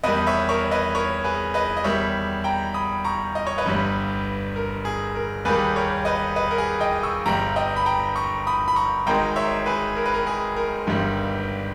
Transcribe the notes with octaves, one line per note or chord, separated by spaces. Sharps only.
E2 D#3 G3 B4 D#5
C#5 E5
A#4 C#5
B4 D#5
A#4 C#5
G#4 B4
B4 D#5
D#5
E2 D#3 G3 C#5 E5
G5 A#5
B5 D#6
A#5 C#6
D#5
C#5
B4 D#5
G1 G2 G3
A#4
G#4
A#4
D#2 D#3 G3 G#4 B4
A#4 C#5
B4 D#5
B4 D#5
A#4
G#4
D#5 G5
C#6 E6
G1 G2 G3 G5 A#5
D#5 G5
B5
G5 A#5
A#5 C#6
B5 D#6
B5
A#5 C#6
G#1 G#2 D#3 G#3 G5 A#5
C#5 E5
G#4 B4
A#4
B4
A#4
G#4
A#4
G1 G2 D#3 G3